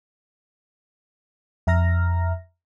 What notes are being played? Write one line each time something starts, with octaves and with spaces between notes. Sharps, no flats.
F2 E5 A#5 F6 A#6